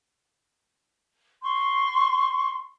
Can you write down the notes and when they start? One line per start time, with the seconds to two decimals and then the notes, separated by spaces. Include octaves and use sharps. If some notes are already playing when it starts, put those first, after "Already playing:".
1.42 C6 C#6